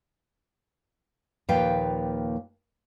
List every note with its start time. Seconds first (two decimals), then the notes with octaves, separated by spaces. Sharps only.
1.49 D#2 A#2 F3 B4 F5 G5